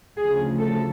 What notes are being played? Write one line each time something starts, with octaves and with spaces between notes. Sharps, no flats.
D2 C#3 F3 G#4
A4